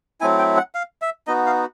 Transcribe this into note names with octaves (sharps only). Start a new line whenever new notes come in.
F#3 A3 C4 E4 G#5
G5
F#5
F5
E5
B3 D#4 F#4 D#5
F5